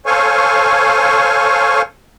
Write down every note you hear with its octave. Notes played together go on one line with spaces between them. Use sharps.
A4 C5 C#5 F5 G#5 C#6